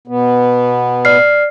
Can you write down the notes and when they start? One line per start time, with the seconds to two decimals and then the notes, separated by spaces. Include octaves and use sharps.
0.08 B2 B3
1.05 D5 F6 C7